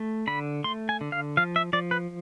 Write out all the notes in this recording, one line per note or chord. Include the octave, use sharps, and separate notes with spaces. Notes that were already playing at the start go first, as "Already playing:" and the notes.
Already playing: A3
D3 B5
A3 C6
G#5
D3
F5
F3 F5
E5
F3 D5
B4